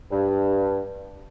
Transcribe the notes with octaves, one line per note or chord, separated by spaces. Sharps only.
G2